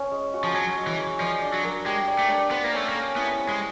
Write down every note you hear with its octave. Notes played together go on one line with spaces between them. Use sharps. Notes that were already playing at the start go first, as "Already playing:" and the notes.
Already playing: C#4
G#3
F#4
F3
F#3 C#4
G#3
E3
G#3
F3 D5
D4
F#3
A#4
G#3 G4
D5
A3
D4
B3 C5
A#3
A3 C#4
A#3
A4
B3 E4
C5
G#3